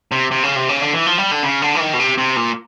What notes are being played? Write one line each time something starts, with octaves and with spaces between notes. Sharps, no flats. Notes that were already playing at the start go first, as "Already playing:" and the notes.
C3
C3
C#3
C3
C#3
D3
E3
F3
G3
D3
C#3
D3
E3
D#3
B2
C3
C3
A#2